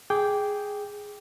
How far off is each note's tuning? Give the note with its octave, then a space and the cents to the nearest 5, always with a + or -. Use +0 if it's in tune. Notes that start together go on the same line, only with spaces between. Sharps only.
G#4 +0 G5 +0 D6 -10